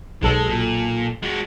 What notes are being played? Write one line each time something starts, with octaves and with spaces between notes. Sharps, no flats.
B1 G#3 A4
A#2
G#3 F#4